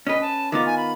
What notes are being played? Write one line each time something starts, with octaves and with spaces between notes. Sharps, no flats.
C#4 B4 D#5
A5
D#3 B3 F4 D6
G#5
B5